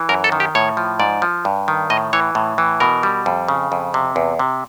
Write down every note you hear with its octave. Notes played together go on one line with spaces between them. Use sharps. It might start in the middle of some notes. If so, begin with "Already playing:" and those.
Already playing: E3
F#2 A#4
A4
D#3
G4
A2 C#5
F3
G#2 D5
F3
G2
D#3
A2 D#5
E3 C#5
A2
E3
B2 A#4
G3
F2
C#3
F2
C3
E2
C3